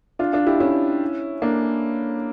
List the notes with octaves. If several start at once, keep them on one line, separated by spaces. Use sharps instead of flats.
D4 F4
D4 F4
E4 G4
C#4 E4
A#3 D4